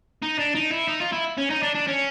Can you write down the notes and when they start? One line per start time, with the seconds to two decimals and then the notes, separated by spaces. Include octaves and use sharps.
0.22 D#4
0.39 D4
0.55 D#4
0.71 E4
0.88 D#4
1.00 F4
1.13 E4
1.38 C#4
1.51 D#4
1.63 D4
1.75 D4
1.88 C#4